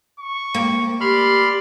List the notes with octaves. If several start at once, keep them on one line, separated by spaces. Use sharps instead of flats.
C#6
A#3
G4 D5 B5 C6 F6